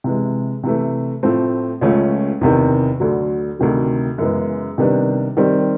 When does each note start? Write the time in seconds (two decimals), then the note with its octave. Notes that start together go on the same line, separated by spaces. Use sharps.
0.04 C3 E3 G#3
0.63 C3 E3 A3
1.23 A2 F3 A3 C4
1.81 C#2 C#3 F3 A3 C#4
2.41 E2 C3 D#3
3.00 D2 D3 F#3
3.59 D2 C3 D#3 F#3
4.18 F#2 C#3 E3 G#3 B3
4.78 C3 D#3 G3 B3 D4
5.37 D#3 G3 C4